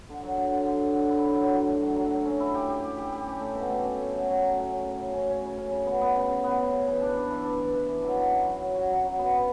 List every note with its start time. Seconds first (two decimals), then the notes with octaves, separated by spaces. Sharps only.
0.09 D3
0.23 F#3
0.37 D3
0.52 D3
0.67 D3
0.81 F#3
0.95 D3
1.10 E4
1.24 F#3
1.39 F#3
1.53 F#3
1.67 A3
1.82 F#3
1.96 F#3
2.11 F#3
2.25 C#4
2.40 E4
2.55 G4
2.69 G4
2.84 G4
2.98 G4
3.12 G4
3.27 C#4
3.41 A3
3.55 B2
3.70 A3
3.84 C#4
3.99 A3
4.14 F#3
4.28 F#3
4.42 F#3
4.56 F#3
4.70 C#4
4.85 C#3
4.99 C#3
5.14 C#4
5.29 C#4
5.43 C#3
5.58 C#4
5.71 C#3
5.86 B3
6.01 B3
6.16 C#3
6.29 C#3
6.44 B3
6.58 C#3
6.73 C#3
6.88 E3
7.02 D4
7.16 D4
7.30 E3
7.44 D4
7.60 E3
7.74 E3
7.88 E3
8.03 F#3
8.17 F#4
8.32 C#4
8.47 F#3
8.60 F#3
8.75 F#4
8.90 F#3
9.03 F#3
9.19 B3
9.33 B3